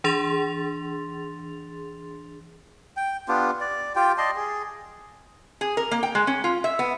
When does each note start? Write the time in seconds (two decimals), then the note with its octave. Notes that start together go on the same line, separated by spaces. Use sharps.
0.04 E3 D4 G#4 C6 A6 F7
2.97 G5
3.28 B3 D4 F4 G4
3.60 D5
3.96 F4 G4 G5
4.18 D5 D#5 A5 C6
4.36 G#4
5.61 G#4
5.77 A#4
5.91 A#3
6.03 G5
6.15 G#3
6.27 C#4
6.44 F4
6.64 E5
6.79 B3